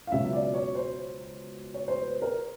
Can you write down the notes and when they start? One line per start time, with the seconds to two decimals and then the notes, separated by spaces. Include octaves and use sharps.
0.07 F5
0.12 C#2 B2 F#3 E5
0.33 D5
0.53 C#5
0.75 C5
1.74 C#5
1.88 C5
2.02 B4
2.22 A#4